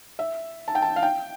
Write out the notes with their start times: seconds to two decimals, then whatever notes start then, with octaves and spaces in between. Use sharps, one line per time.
0.19 E5
0.68 A5
0.75 G5
0.82 A5
0.96 F5
1.03 G5